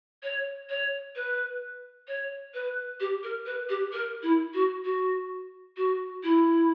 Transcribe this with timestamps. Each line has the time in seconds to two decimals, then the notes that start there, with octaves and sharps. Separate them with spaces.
0.23 C#5
0.70 C#5
1.16 B4
2.08 C#5
2.54 B4
3.00 G4
3.23 A#4
3.46 B4
3.69 G4
3.92 A#4
4.23 E4
4.54 F#4
4.85 F#4
5.77 F#4
6.23 E4